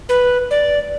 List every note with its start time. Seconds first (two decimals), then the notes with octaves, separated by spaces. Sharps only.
0.09 B4
0.51 D5